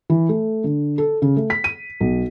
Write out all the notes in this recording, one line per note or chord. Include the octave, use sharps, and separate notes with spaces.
E3
A3
D3
A4
C#3
A3
B6
D#7
B1